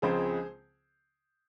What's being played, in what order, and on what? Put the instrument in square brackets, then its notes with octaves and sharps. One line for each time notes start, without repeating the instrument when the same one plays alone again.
[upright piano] C#2 C#3 F3 G#3 C4 G#4 C5